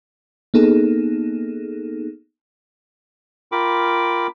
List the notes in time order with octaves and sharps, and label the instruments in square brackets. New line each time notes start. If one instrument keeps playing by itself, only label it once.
[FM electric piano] A#3 B3 D#4 G#4 A4
[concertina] F4 A#4 G5 B5 D6